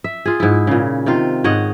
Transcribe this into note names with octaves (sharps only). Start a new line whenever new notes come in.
E5
F4 G#4
G#2 E4
A#2 C#3
C3 D#3 F4
G#2 C#5 D#5 F#5